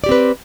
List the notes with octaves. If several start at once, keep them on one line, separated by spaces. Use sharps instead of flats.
C4 G4 B4 D5